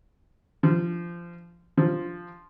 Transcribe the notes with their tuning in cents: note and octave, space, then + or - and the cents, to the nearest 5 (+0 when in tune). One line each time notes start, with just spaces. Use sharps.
F3 -20
F3 +0